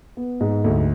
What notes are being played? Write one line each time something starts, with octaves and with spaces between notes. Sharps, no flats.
B3
G#2
D2